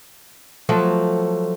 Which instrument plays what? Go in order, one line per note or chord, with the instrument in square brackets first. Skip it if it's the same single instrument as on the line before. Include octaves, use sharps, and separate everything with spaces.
[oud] F3 F#3 A3